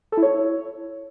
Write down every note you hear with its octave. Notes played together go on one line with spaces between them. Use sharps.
A4
E4
C#5